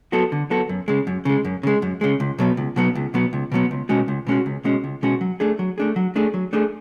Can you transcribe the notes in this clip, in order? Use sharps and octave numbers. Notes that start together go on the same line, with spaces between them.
F#3 B3 F#4 A4
D3
F#3 B3 F#4 A4
F#2
C#3 G#3
F#2
C#3 G#3
F#2
C#3 G#3
F#2
C#3 G#3
C#2
B2 F#3 B3
C#2
B2 F#3 B3
C#2
B2 F#3 B3
C#2
B2 F#3 B3
C#2
B2 G#3 C#4 F#4
C#2
B2 G#3 C#4 F#4
C#2
B2 G#3 C#4 F#4
C#2
B2 G#3 C#4 F#4
F#3
A3 D4 G#4
F#3
A3 D4 G#4
F#3
A3 D4 G#4
F#3
A3 D4 G#4